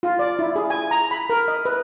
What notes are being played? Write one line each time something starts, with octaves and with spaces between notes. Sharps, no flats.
F4
D5
E4
G#4
G#5
A#5
B5
A#4
D#5
B4